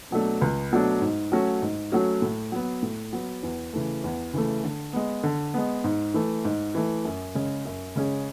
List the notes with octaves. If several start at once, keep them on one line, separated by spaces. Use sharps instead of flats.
B2 F#3 A3 D4
C#2
B2 F#3 A3 D4
G#2
F#3 A3 C#4 F#4
G#2
F#3 A3 C#4 F#4
A2
F#3 B3
A2
F#3 B3
E2
C#3 E3 A3
E2
C#3 E3 A3
D3
G#3 B3
D3
G#3 B3
G#2
E3 A3
G#2
E3 A3
F#2
C#3 G#3 C#4 G#4
F#2
C#3 G#3 C#4 G#4